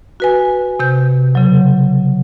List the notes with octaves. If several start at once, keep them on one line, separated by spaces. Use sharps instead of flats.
F#4 B4 G#5
C3 G6
C#3 F#3